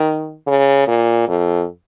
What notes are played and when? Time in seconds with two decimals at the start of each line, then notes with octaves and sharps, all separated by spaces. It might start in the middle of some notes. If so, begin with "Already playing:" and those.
Already playing: D#3
0.47 C#3
0.88 A#2
1.28 F2